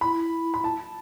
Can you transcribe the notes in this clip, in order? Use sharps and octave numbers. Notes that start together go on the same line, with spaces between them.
E4 B5
B5
A5